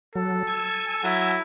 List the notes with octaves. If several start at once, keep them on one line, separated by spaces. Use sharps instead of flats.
F#3 A4
G#5 E6
F#3 E4